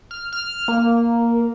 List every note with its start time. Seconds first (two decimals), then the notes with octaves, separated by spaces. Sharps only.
0.11 F6
0.33 F6
0.68 A#3